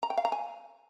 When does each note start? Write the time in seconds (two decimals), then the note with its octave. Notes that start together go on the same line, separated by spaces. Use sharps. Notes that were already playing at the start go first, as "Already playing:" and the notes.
0.03 A#5
0.10 G5
0.17 F5
0.25 A#5
0.32 G#5